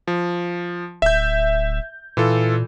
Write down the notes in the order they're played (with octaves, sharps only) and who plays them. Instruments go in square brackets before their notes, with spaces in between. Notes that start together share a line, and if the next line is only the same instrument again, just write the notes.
[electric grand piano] F3
[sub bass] D1 [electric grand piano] E5 G6
[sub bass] A#2 [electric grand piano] E3 F4 A4